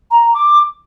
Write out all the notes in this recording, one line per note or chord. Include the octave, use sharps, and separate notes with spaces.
A#5
D6